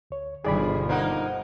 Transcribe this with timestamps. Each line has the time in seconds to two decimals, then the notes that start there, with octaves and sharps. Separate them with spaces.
0.11 D2 C#5
0.44 G1 B2 D#3 F3 G#4 D5 B5
0.89 A#3 D#4 A#4 C5 F#5